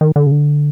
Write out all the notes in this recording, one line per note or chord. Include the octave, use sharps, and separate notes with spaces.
D#3
D3
C#3
D3